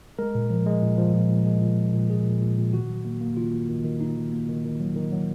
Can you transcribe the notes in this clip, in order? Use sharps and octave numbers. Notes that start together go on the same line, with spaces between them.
G#3 A#4
A#2
F3
G#3
A#2
F3
A#2
A#2
G#3
A#2
A#2
A#2
A#2 G#4
A#2
A#2
A#2
D#3 F#4
F#3
A#3
A#3
D#3 F4
A#3
D#3
D#3
A#3 D#4
D#3
A#3
D#3
D#3
F#3
D#3
F#3